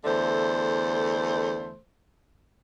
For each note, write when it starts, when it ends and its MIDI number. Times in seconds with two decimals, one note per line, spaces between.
0.04 1.77 40
0.04 1.77 50
0.04 1.77 57
0.04 1.77 72